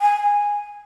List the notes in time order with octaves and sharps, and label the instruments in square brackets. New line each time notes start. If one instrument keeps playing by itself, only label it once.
[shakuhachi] G#5